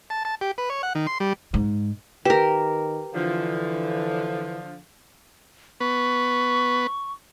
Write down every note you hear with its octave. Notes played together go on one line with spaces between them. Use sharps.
A5
A5
G4
B4
C#5
F#5
D#3
C6
G3
G#2
D#3 G4 A#4 B4 G5 E7
D3 E3 F3
B3 B4 C#6